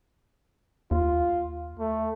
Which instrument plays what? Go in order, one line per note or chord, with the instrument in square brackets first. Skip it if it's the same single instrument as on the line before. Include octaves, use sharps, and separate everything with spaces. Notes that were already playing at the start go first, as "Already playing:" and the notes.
[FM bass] D#2 [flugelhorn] F4
[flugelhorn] A3